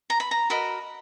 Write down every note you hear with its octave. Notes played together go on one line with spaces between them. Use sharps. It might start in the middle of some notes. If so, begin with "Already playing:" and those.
A#5
B5
A#5
F#4 A#4 D#5 B5